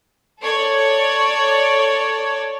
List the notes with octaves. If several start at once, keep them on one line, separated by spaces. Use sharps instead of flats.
A4 C#5 D5